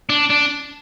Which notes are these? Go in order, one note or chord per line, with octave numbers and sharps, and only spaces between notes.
D4
D4